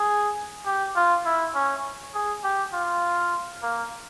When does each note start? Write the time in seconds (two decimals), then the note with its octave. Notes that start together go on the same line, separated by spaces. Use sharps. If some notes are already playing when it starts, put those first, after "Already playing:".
Already playing: G#4
0.66 G4
0.96 F4
1.25 E4
1.55 C#4
2.14 G#4
2.44 G4
2.73 F4
3.62 A#3